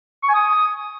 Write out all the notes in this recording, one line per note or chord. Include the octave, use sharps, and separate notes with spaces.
C#6
G#5
D#6